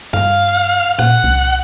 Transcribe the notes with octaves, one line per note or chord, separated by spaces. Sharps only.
G2 F5
A#2 F#5
C2